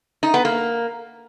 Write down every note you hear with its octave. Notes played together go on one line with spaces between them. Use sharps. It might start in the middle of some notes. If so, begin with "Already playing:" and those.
D#4
B3
A#3